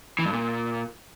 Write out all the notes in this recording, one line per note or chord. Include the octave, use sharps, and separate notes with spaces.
E3
G2
A#2